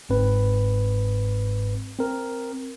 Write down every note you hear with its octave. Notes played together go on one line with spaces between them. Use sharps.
G1 G#2 C4 B4
C4 A#4